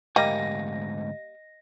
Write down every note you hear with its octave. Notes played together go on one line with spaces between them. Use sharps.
D2 G#2 G3 A#3 D#5 A#6